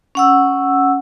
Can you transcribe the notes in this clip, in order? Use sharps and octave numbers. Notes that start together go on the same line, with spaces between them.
C#4 F#5 E6